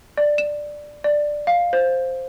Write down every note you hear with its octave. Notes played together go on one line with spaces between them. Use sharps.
D5
E7
D5
F5
C5